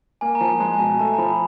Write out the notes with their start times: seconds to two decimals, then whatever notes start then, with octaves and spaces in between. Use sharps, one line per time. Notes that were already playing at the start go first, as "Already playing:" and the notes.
0.21 A#3 G#5
0.35 A#5
0.41 F3 A5
0.60 G#3 A#5
0.73 G#5
0.79 B2 A5
0.99 A3 A5
1.14 A#5
1.18 F3 B5